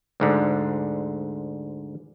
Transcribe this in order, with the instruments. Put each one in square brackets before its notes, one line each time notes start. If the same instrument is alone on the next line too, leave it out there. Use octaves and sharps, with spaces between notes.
[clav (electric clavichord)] D2 G#2 D3